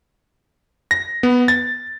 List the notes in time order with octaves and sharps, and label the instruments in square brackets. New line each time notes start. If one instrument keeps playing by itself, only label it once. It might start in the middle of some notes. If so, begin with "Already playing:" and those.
[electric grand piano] A#6
B3
A6